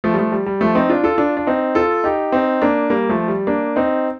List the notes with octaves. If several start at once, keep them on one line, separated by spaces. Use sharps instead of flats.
F3 A3
G3
F3 A3
G3
G3
F3 A3
C4 D#4
D4 F4
F4 A4
D4 F4
D4
C4 D#4
F4 A4
D#4 G4
C4 D#4
A#3 D4
G3 A#3
F3 A3
G3
A#3 D4
C4 D#4